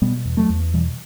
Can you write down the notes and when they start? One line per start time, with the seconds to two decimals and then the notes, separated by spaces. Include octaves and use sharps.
0.02 B2 G3 B3
0.25 E2
0.37 F#3 A3
0.50 E2
0.74 B2 E3 G3